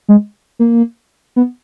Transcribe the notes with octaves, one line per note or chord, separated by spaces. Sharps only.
G#3
A#3
B3